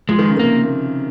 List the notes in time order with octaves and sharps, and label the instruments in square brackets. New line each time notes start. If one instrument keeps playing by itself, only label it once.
[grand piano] F3 [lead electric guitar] G#3
[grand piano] D#3
C#3
[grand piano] C3 D#3 [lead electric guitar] A#3